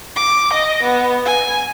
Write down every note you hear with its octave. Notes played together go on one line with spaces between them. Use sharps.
D6
D#5
B3
G#5